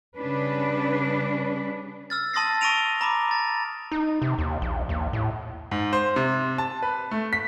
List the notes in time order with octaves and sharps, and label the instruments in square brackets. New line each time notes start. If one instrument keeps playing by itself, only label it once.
[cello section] C#3 G3 C#4 D4 B4
[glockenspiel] E6 F6 A6
A5 C6 D#6 A6 A#6 C7
C#6 E6 A#6 D7 D#7 F7
A#5 B5 D6 F7
A6
[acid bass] D#4
C3
D#2
A#1
D#2
A2
[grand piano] G#2
C5
C3
A5
B4
A3
B6